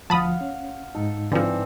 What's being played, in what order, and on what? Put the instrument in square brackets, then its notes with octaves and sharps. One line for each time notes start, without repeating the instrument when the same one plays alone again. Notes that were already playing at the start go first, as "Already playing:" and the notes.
[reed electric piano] D2 F3 [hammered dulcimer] F5 F#5 [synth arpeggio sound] A5 B5 D#6
[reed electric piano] C#4
[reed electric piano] G#2 D#4 [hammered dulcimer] A4
[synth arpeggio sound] D3 F3 [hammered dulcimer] E3 C4 D4